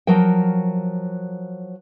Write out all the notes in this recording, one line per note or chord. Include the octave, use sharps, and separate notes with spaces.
F3 F#3 A#4 G5